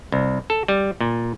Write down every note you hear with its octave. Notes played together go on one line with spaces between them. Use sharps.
C2
A4
G3
A#2